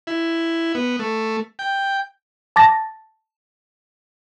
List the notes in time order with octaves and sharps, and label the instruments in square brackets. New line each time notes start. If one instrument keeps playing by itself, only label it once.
[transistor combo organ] E4
B3
A3
G5
[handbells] A5 D6 A6 A#6